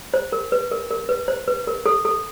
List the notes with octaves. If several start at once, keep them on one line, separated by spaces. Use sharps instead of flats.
C5
A#4
B4
A#4
A#4
B4
C5
B4
A#4
A4
A4